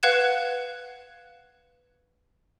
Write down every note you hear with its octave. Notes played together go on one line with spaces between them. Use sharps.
B4 F5 F#5 F#6 G#6 E7